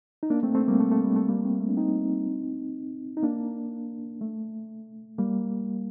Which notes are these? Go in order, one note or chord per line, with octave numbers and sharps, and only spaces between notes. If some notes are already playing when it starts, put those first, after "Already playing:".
D#4
A#3 D4
A3 C4
A3 C4
G3 A#3
A3
A3
G3
A3
G3 A#3
A3 C4
A3
D4
C4 D#4
D#4
A#3 D4
A3
G3 A#3